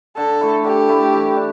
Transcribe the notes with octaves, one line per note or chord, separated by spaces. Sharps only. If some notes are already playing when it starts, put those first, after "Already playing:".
D3 A4
A3 E4
D3 G4
A3 E4
E3
D4